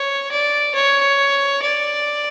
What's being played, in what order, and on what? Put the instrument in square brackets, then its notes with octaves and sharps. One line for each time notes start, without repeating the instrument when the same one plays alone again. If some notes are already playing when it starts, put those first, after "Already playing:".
Already playing: [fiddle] C#5
D5
C#5
D5